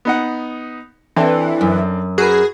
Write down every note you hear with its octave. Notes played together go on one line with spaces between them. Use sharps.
B3 D#4 F#5
E3 C4 D4 A4
F#2
F#4 G#4 A#4 B4